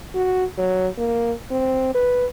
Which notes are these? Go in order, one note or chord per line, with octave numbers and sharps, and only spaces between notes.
F#4
F#3
A#3
C4
B4